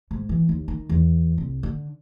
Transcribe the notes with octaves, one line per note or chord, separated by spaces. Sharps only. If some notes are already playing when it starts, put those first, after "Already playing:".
G#2
E3
D#2
D#3
E2
C2
D3